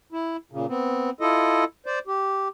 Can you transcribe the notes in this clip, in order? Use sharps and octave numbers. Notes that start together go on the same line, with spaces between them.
E4
A#2 C#3
B3 C4
E4 F4 A4 D#5
C5 D5
G4